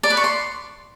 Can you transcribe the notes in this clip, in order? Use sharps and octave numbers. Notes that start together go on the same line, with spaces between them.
D5
B4
C#6
C6